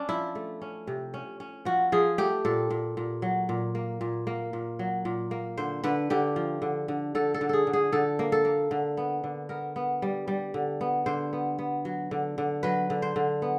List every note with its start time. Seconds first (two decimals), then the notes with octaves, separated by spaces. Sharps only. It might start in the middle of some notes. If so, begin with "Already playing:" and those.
Already playing: C#4 D4
0.09 F3 E4
0.35 A3
0.62 C#4
0.87 C3
1.14 C#4
1.40 C#4
1.65 F3 F#4
1.92 F3 G#4
2.18 A3 G4
2.45 A#2 A4
2.70 A#2
2.97 A#2
3.22 F#3
3.49 A#2
3.75 A#3
4.01 A#2
4.27 A#3
4.53 A#2
4.79 F#3
5.05 A#2
5.31 A#3
5.57 D3 C5
5.84 D3 B4
6.10 D3 G4
6.36 F3
6.62 D3
6.88 D3
7.15 D3 A4
7.34 A4
7.41 D3
7.49 G#4 A4
7.67 D3
7.73 G#4
7.92 D3 A4
8.19 A#3
8.32 A4
8.45 A#3
8.71 D3
8.97 B3
9.24 D3
9.49 B3 A#4
9.76 B3
10.02 G3
10.28 G3
10.54 D3
10.81 B3
11.06 D3 C5
11.33 B3
11.59 B3
11.85 F#3
12.11 D3
12.38 D3
12.63 F#3 B4
12.90 D3
13.02 C5
13.16 D3
13.42 B3